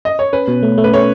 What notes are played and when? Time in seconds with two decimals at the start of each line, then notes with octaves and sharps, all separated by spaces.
0.05 D#5
0.19 C#5
0.33 C#4 B4
0.48 B2
0.63 A3
0.78 A3
0.84 B4
0.93 A3 C#5